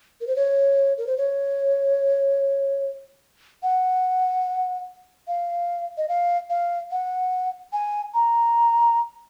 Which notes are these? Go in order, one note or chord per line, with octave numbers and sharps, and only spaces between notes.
A#4
C5
C#5
A#4
C5
C#5
F#5
F5
D#5
F5
F5
F#5
G#5
A#5